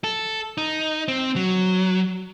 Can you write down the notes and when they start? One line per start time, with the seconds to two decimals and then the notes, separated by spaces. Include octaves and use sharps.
0.04 A4
0.58 D#4
1.08 C4
1.36 F#3